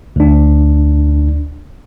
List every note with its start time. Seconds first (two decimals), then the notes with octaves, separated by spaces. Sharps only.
0.16 D2 D4